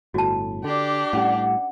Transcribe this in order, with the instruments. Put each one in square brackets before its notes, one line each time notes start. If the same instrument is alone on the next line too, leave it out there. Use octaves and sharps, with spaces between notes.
[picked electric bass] G1 A2 [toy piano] F#4 A5
[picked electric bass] D3 [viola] D4 G4
[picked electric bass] A2 G3 [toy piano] C#4 [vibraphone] F#5